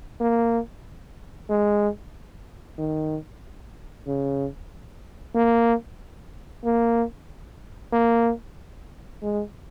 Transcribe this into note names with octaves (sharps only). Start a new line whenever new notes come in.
A#3
G#3
D#3
C#3
A#3
A#3
A#3
G#3